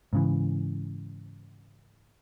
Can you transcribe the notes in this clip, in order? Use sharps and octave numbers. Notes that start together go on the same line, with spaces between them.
G#2 C#3 E3